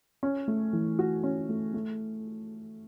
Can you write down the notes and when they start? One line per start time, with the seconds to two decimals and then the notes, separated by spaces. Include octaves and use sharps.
0.23 C#4
0.48 A3
0.73 E3
0.99 F#4
1.24 C#4
1.49 A3
1.74 A3